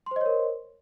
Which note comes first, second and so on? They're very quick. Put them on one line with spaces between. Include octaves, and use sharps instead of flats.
C6 C5 D#5 C#5 A#4